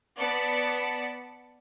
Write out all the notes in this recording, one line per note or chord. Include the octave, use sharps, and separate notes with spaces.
B3 D5 A5 B5 C#7